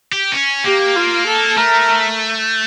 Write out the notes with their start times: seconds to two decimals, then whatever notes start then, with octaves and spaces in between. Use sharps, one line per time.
0.12 G4
0.32 C#4
0.64 A#3 G4
0.95 F4
1.26 A4
1.57 A3 A#4